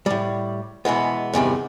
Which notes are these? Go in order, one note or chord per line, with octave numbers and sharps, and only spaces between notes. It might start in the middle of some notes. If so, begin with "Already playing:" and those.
A2 G3
B2 E3 G#3 B3
E2 G2 C3 D#3